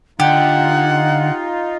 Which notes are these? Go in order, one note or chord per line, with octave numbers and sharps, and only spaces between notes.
D3 D#4 F4 G4 F#5